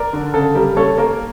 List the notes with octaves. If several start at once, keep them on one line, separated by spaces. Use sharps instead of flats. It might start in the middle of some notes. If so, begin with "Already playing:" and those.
Already playing: A#4 D5
D3
C#3 A4
G3 A#4
A#3 A4 C#5
A#3 A#4